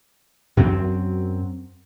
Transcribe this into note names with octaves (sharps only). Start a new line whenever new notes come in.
F#2 F#3 C4